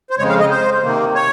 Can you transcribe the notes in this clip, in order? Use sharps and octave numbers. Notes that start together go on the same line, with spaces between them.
C5
F2 C#3 G#3 C#5
F5
D#5
C5
C3 D#3 A#3
C#5